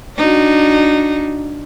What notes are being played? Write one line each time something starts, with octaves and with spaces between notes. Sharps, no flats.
D4 D#4 F#4